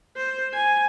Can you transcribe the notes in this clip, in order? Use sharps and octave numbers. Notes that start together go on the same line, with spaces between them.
C5
G#5